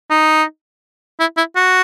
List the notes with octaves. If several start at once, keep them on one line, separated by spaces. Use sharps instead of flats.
D#4
E4
E4
F#4